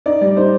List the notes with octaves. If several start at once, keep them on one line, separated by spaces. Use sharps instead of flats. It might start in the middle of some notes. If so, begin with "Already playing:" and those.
D#4 D5
G3 D5
D#4 C5